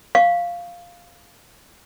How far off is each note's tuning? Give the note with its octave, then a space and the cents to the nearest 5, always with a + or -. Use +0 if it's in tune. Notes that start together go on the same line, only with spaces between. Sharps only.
F5 +0 C#6 +5